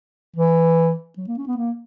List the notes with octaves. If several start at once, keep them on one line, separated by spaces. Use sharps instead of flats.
E3
F#3
A#3
C#4
B3
A#3